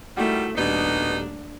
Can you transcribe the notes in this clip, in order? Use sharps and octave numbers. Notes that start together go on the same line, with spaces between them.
D#3 G3 A3 E4 F#4
D#1 B2 G3 A3 B3 D4 D#4